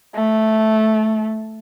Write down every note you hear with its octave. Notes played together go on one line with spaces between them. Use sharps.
A3